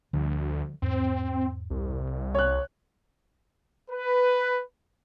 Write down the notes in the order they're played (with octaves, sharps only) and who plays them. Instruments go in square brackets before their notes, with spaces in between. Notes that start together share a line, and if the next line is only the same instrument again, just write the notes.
[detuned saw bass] D2 [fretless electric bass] D3 F3 G3
[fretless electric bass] E2 G#2 [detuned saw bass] C4
[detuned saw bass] C2
[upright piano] C#5 F#6
[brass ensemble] B4